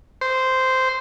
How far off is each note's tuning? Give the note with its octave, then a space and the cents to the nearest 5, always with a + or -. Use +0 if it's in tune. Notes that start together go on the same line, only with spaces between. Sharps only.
C5 -10